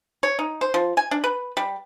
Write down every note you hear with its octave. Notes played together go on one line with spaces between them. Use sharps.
C#5
D#4
C5
F3
G#5
D4
B4
G3